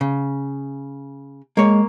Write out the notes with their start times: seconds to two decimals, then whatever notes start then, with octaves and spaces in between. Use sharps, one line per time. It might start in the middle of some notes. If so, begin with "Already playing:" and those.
0.01 C#3
1.57 G#3 A#3 C#5